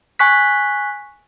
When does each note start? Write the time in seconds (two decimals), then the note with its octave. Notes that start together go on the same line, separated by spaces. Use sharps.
0.19 G#5 C#6 F#6 B6